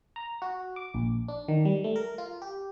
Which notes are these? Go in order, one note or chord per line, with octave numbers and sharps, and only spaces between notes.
A#5
F#4
D6
A#1
D4
D#3
G3
A3
A#4
F4
G4